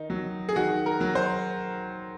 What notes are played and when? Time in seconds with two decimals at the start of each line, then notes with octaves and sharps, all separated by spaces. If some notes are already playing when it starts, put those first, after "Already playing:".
Already playing: D#3 D#4
0.10 F#3
0.49 G#4
0.56 D#3 F#4
0.86 A#4
1.01 F#3
1.15 C5